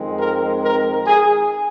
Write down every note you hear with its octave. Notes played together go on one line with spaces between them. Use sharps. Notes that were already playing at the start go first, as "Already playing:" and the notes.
Already playing: F2 D#3 G#3 C4
A#4
A#4
G#4